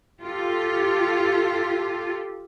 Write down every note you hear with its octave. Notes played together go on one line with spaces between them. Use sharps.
F4 G4 A4